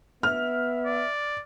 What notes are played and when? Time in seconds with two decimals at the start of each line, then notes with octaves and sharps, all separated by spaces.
0.23 B3 E5 F6
0.86 D5